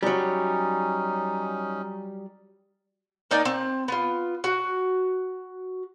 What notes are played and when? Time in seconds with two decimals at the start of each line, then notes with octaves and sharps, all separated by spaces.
0.03 F#3 G3 C#4 D#4
3.31 A#3 D#4 D5 G#5
3.45 C4
3.88 B3 F4
4.44 F#4